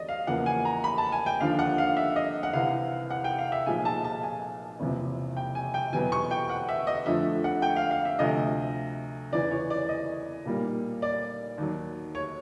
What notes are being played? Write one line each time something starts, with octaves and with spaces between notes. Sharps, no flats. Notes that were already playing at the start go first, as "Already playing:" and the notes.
Already playing: E1 D5 D#5
F5
E2 C#3 F3 A#3 F#5
G#5
A#5
B5
A5
G#5
G5
D#2 D3 F3 F5
F#5
F5
E5
D#5
F#5
C2 C3 E3 F5
F#5
G5
F5
E5
B1 A#2 F3 G#3 G#5
A5
A5
G#5
F#1 E2 C3 F3
G5
G#5
G5
E2 B2 F#3 B3 G#5
C#6
G5
F#5
E5
D#5
F2 D3 F3 A3 E5
F#5
G5
F5
F5
E5
D2 C3 F3 A3 D#5
E2 C#3 E3 D5
C#5
D5
D#5
B1 A#2 G3 A#3
D5
D#2 D#3 F#3
C#5